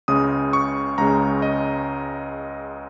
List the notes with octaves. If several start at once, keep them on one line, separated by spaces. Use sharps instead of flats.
C#2 C#3 G#3 D#6
C#6
C#2 C#3 G#3 A#5
D#5